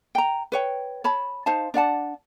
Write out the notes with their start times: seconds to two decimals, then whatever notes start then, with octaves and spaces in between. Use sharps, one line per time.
0.15 G5 A#5
0.52 B4 C#5 G5
1.04 C#5 A5 B5
1.46 D#4 C5 F5 A5
1.74 D4 D5 F#5 A5